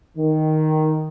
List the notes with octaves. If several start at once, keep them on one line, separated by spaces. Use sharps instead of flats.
D#3